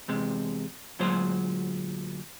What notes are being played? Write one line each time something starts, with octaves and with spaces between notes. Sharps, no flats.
E2 C3 G#3
D2 A#2 F#3 G#3 C5 C6